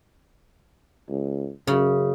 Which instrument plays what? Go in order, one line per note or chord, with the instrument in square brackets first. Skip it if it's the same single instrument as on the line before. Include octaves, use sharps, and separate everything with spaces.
[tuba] C#2
[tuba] F#2 [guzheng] C#3